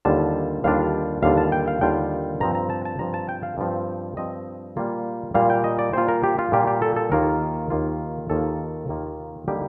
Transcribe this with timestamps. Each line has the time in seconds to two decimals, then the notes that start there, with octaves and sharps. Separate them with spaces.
0.05 D#2 D3 G3 D4 F4 A5
0.64 D#2 D3 G3 D4 F4 F5
1.23 D#2 D3 G3 D4 F4 F5
1.37 A5
1.52 G5
1.68 F5
1.81 D#2 D3 G3 D4 F4 G5
2.40 G2 F3 C4 A#5
2.55 A#5
2.70 A5
2.85 A5
2.99 G2 F3 C4 A#5
3.14 A5
3.29 G5
3.43 F5
3.58 G2 F3 C4
4.17 G2 F3 C4 D#5
4.77 A#2 G3 A#3 F4
5.34 A#2 G3 A#3 F4 F5
5.50 G5
5.64 D#5
5.79 D5
5.93 A#2 G3 A#3 F4 C5
6.08 A#4
6.23 G4
6.39 F4
6.52 A#2 G3 A#3 F4 G4
6.67 G4
6.82 A4
6.96 A4
7.12 D#2 D#3 A#3 F4 A#4
7.70 D#2 D#3 A#3 F4
8.30 D#2 D#3 A#3 F4 A4
8.88 D#2 D#3 A#3 F4
9.48 D3 G3 A#3 D#4 G4